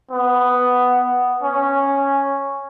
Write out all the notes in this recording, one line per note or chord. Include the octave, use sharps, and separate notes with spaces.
B3
C#4